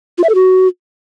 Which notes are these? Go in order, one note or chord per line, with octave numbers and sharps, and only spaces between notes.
F4
E5
A4
F#4